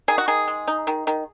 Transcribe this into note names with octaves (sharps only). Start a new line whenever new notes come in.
D#3 G#4
F#4
D#3 G#4
G#3
D#4
D#3
D#3